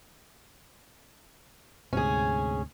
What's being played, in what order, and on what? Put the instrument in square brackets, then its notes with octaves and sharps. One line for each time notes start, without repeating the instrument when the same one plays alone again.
[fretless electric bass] D2 G#2 C3 [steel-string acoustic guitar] C#4 G#4